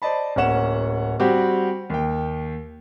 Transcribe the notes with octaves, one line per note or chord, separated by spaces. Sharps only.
C5 D5 D#5 A5 B5
D1 A#3 C#4 F#5 E7
G3 C4 F#4 G4
D#2 G5